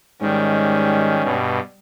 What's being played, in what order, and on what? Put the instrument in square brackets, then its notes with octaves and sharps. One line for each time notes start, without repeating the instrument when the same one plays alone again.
[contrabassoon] G#2 [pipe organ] D#3 [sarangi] G3 [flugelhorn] C#4
[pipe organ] G2 B2